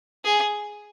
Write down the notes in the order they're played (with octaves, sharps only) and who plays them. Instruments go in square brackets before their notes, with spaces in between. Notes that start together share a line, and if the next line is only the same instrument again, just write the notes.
[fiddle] G#4